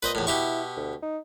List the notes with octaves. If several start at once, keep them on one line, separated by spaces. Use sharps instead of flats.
A#2 B4 C5 D#5
E2 A2
B2 E4 G4 C#6
D2
D#4